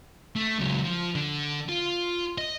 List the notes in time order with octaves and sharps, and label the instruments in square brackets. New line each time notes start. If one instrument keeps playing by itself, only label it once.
[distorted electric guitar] A3
C#2 F#3
F3
D3
F4
D#5